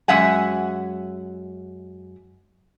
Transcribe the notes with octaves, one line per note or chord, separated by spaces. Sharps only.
F#2 G#3 E5 F#5 G#5